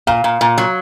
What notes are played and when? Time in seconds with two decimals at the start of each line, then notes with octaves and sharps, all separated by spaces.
0.07 A#2 F5
0.24 A#2
0.41 A#2
0.58 F#3